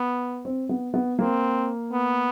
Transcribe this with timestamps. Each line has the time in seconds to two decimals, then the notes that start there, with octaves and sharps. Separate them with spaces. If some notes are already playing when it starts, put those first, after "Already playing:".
Already playing: B3
0.45 C4
0.69 B3
0.94 B3
1.19 A#3 C4
1.92 B3